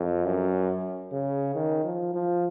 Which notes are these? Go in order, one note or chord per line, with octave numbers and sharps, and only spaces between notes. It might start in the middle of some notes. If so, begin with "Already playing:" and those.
Already playing: F2
F#2
C#3
D#3
F3
F3